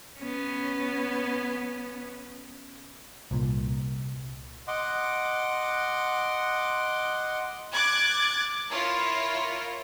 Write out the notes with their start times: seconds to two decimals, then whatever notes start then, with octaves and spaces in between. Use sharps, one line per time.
0.19 B3 C#4
3.31 C2 A#2
4.68 D#5 F#5 C6 D6
7.74 D6 F#6 G#6 A6
8.70 E4 F4 A#4 C#5